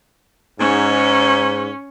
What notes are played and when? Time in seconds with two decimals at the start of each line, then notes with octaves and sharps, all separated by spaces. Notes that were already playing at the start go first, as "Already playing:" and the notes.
0.60 G#2 C#4